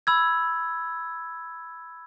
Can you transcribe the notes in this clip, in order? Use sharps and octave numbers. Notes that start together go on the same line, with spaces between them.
B5 E6 G#6